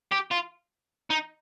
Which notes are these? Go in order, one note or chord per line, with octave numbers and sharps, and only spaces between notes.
G4
F4
D#4